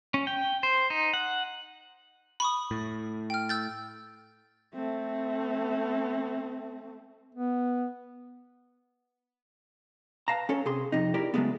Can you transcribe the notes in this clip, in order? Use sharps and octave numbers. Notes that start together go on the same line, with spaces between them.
C#4
G5
C5
D#4
F#5
B5 C#6 D#6
A2
G5 F6
E6 G6 A6
A3 C4
B3
B4 F5 A5 A#5
C#4 A4 C#5
C3 G#4 C6
F2 C3 D#4
E4 G4 A#4 D5
C#3 F3 F#3 G#3 A3 B3